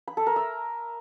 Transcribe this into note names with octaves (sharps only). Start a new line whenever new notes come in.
B5
A4
A#4
E5